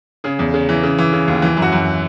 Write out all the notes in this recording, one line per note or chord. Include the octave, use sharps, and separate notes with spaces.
C#3 G#4
E2
C#3
E3
C#3
E3
C#3
D#2
E3
F#2
F#4
F#2